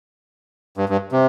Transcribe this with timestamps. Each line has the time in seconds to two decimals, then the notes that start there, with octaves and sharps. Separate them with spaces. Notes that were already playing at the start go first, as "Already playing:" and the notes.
0.77 G2
0.89 G2
1.12 C3